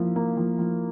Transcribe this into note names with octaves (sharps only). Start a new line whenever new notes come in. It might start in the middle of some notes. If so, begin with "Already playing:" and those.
Already playing: F3 A#3 E4
A#3
F3
F3